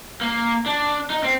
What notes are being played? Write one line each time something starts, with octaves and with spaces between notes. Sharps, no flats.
A#3
D4
D#4
C4